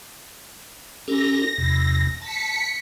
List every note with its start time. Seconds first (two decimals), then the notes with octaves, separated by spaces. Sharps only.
1.08 C#4 G4 A4 A#6
1.58 E2 C3
2.22 A5 B6 C#7